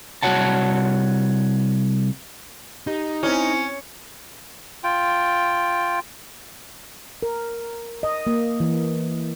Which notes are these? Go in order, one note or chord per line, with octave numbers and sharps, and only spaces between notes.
C2 F2 F#4 C#5 F#5 A5
D#4 G4
C4 C#4 E4
F4 G5
A#4
D#5
A#3
E3